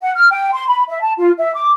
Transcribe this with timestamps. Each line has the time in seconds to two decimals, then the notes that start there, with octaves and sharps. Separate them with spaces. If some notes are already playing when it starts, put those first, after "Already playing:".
0.01 F#5
0.16 F6
0.31 G5
0.53 C6
0.68 B5
0.87 E5
1.01 A5
1.17 F4
1.37 E5
1.54 D6